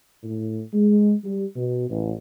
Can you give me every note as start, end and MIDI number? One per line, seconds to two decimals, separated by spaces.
0.23 0.61 45
0.74 1.14 56
1.24 1.45 55
1.56 1.87 47
1.89 2.13 33